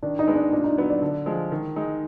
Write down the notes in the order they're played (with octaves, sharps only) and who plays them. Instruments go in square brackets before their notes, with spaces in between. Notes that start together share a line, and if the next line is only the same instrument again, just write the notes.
[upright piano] D#3 [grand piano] D4
[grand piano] D#4
[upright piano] G#3 B3
[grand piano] D4
[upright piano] A#2 [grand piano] D4
[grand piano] D#4
[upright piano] F#3 B3
[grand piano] D5
[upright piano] D3
F3 G#3
D#3
G#3 D#4